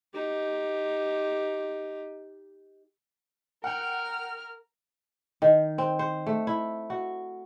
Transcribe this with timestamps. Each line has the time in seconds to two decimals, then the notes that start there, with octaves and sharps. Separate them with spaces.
0.14 D#4 G4
3.64 A#4 F#5 G5 F6
5.42 D#3
5.78 C4
5.99 C5
6.27 A3
6.47 E4
6.90 F#4